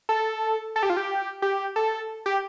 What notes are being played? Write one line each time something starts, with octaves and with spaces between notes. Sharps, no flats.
A4
A4
G4
F4
G4
G4
A4
G4